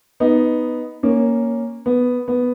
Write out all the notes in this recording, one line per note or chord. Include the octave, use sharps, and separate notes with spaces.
B3 D#4
A#3 C#4
B3
B3